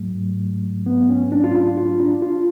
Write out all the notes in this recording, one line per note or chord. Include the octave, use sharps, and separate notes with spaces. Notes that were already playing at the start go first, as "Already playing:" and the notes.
Already playing: G#2 F#3 A3
B3
C#4
D4
F4
D4
F4
D4
F4